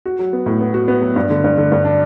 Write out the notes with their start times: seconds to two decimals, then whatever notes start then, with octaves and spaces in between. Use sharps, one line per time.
0.06 F#4
0.19 F#3
0.33 B3
0.46 A2
0.61 B3
0.74 F#4
0.88 B3
1.02 F#3
1.16 G2
1.30 D3
1.44 G2
1.57 D3
1.72 G2
1.85 D4